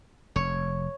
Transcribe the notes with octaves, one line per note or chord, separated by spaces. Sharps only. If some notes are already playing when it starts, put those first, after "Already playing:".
F1 C#5